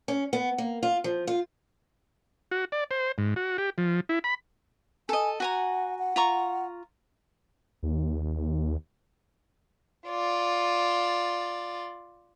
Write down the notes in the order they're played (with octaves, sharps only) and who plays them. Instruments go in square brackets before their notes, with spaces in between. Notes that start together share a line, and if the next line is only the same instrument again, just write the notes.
[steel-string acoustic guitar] C#4
B3
A#3
F4
F3
F4
[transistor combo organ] F#4
D5
C5
G#2
F#4
G4
F3
E4
B5
[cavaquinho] A4 D#5 [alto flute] G#5
[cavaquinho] F#4 G#5 A#5 [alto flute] F#5
[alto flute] F#5
[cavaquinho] F4 A#5 C#6
[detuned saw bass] D#2
[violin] F4 D5